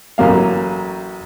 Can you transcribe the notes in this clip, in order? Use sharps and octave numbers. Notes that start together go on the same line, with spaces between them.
A1 F#3 A#3 F5